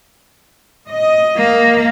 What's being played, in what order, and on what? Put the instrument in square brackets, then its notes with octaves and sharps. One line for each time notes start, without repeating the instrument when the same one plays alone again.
[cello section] D#5
[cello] A#3